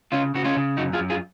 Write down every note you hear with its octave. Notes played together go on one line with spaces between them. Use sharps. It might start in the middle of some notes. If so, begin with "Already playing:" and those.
C#3 C#4 F4
C#3 F#4
C#4 F4
C#3
F#2 D#4 F#4
F4 G#4
F#2
F4 G#4